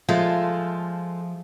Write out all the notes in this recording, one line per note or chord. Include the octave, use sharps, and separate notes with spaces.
F3 G#3 A3 F4